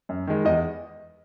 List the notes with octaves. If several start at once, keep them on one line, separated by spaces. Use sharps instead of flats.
F#2
D#3 G#3
E2 D#5